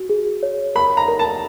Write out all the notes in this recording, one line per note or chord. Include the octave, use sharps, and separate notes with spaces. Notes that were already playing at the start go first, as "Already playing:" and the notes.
Already playing: F#4
G#4
C#5
A#4 B5
A#5
A#4
A5